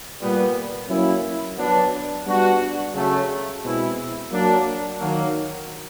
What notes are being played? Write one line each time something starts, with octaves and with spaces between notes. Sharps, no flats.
A#2 G3 B3
F#3 A#3 C#4 E4
F#3 B3 D4
G3 B3 D4 F#4
C#3 F#3 A3
B2 G#3 C4 E4
F#3 A#3 D4
D#3 F#3 A#3